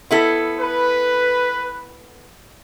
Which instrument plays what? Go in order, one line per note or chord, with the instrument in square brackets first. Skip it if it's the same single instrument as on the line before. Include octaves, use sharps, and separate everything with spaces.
[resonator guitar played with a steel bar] B3 E4 A4
[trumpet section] B4